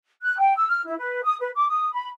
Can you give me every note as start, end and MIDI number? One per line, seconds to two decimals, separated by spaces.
0.22 0.38 90
0.38 0.54 79
0.56 0.66 88
0.68 0.82 89
0.86 0.97 64
0.99 1.22 71
1.23 1.35 87
1.40 1.50 71
1.56 1.69 86
1.69 1.89 87
1.92 2.09 83